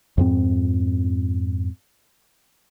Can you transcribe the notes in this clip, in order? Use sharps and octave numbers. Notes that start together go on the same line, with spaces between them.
F2 G#2 C4